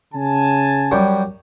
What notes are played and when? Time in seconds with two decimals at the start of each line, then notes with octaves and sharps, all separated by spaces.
0.14 C#3 G#5 A5
0.91 F#2 G3